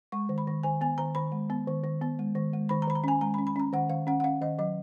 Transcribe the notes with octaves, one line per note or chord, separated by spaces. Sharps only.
G#3 C#6
D#3
B5
D#3
D#3 G#5
B3 G#5
D#3 A#5
D#3 B5
G#3
B3
D#3
D#3
B3
G#3
D#3
G#3
D#3 B5
A#5
D#3 B5
A#5
C#4 G#5
G#3 A#5
B5
C#4
B5
C#4 A#5
D#3 F#5
D#3 F5
C#4 F#5
F#5
C#4 F5
D#3 D#5
F#3 D#5